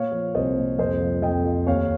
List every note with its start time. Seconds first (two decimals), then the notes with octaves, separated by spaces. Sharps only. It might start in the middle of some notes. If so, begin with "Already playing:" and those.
Already playing: A#2 C#5 F5
0.12 F3
0.35 C2 C5 D#5
0.57 A#2
0.78 F2 C5 D#5
1.00 F3
1.22 F2 D#5 G5
1.45 F3
1.67 D#2 C#5 F5